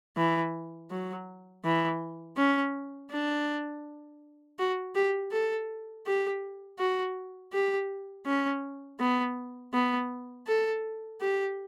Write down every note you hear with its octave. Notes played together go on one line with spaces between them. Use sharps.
E3
F#3
E3
C#4
D4
F#4
G4
A4
G4
F#4
G4
C#4
B3
B3
A4
G4